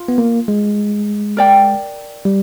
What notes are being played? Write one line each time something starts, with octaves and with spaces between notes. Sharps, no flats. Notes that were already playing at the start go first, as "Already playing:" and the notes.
Already playing: F4
B3
A#3
G#3
A#4 D5 G5
G3